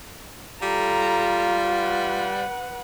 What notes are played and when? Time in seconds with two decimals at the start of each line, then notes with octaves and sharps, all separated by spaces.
0.62 G3 F4 A4 A#5
1.67 B4 F#5